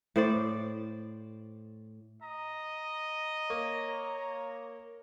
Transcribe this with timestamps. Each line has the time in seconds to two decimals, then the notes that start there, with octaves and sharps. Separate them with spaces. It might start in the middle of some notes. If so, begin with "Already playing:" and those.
0.16 A2 C5 D5
2.22 D#5 A#5
3.50 A#3 C#5